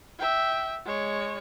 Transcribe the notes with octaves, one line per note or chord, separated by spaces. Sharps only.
E5 G5
G#3 C#5